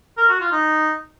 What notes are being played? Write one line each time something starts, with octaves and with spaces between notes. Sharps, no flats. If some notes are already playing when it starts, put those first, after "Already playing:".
A#4
F#4
F4
D#4